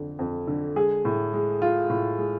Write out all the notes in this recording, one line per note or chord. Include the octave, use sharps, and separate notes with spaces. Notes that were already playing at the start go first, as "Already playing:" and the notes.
Already playing: F2 D3
F2
D3
G#3 G#4
A2
G#3
G#3 F4
A2
G#3